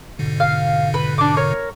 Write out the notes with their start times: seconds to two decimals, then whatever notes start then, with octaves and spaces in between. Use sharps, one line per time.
0.19 G#2 B2 D3
0.40 F5
0.94 B4
1.18 D4 D6
1.37 A#4 C#5